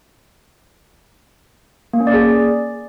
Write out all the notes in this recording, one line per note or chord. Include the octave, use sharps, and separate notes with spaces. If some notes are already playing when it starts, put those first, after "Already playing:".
A#3
C#4
D5
G#4